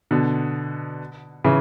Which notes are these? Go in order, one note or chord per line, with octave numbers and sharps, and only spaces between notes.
B2 D3
C#3 E3